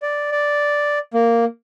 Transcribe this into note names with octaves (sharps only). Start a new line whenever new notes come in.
D5
D5
A#3